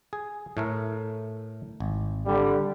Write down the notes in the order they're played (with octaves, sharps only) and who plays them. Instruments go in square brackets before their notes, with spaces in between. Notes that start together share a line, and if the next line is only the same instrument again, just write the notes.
[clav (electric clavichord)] G#4
A2 A3 A#4
G#1
[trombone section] D3 G3